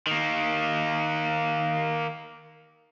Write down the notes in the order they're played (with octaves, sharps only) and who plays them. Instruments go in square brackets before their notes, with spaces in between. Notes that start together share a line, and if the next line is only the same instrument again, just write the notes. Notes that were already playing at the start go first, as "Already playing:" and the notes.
[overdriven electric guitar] D#3 A#3